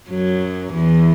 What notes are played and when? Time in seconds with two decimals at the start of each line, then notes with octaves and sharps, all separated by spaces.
0.10 F#2 F#3
0.73 E2 E3